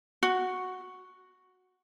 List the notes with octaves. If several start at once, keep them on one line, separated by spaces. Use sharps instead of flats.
F#4